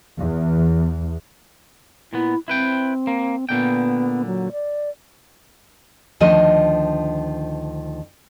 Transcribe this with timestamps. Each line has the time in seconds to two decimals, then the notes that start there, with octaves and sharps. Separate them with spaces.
0.18 E2
2.13 A#2 B3 E4
2.48 C4 E4 B4 G5
3.07 A#3
3.49 A#2 D3 B3 G5
4.26 F#3
4.52 D5
6.20 D2 D#3 F3 D4 D#5